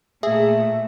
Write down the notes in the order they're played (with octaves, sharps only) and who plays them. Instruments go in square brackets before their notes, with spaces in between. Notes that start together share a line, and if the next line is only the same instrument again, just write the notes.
[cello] A#2 A3 [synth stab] G#4 [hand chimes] E5